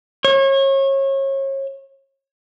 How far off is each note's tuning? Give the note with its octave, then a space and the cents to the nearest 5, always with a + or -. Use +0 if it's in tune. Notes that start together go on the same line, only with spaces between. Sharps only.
C#5 -30